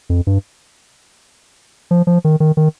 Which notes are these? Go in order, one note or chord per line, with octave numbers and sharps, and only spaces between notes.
F2
G2
F3
F3
D#3
D#3
D#3